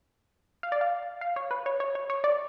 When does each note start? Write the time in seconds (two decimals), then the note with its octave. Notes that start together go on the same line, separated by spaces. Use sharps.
0.63 F5
0.72 D5
0.81 F5
1.21 F5
1.36 C#5
1.51 B4
1.66 C#5
1.80 C#5
1.95 C#5
2.10 C#5
2.24 D5